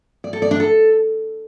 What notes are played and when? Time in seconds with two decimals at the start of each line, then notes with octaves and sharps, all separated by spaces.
0.24 D5
0.33 A4
0.42 D5
0.51 D4
0.60 A4